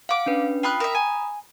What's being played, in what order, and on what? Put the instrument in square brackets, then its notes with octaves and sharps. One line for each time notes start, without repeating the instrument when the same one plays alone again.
[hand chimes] F5 [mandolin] F#5 D6
[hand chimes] C#4 D4 B4
[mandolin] F4 B5 F#6 [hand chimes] G5 D#6
[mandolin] A#4 E5 [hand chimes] A#5 B5 D#6
[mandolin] G#5